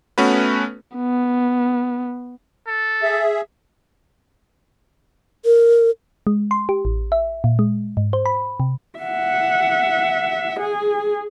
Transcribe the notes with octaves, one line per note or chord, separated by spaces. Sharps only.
A3 B3 C#4 F#4 B4
B3
A4
G#4 E5
A#4
G#3
C6
G4
A1
E5
A#2
G#3
G#2
C5
B5
C3
E5 F#5
G#4